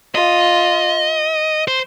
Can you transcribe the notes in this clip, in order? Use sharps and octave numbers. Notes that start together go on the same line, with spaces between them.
F4 D#5
C5